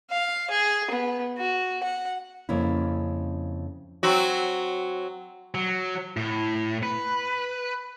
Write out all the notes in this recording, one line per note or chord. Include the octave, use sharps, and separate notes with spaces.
F5
G#4
B3
F#4
F#5
F2 C#3 A#3 C#4 E4
F#3 C4 F#4
F#3
A2
B4